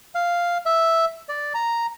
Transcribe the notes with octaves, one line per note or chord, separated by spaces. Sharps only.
F5
E5
D5
A#5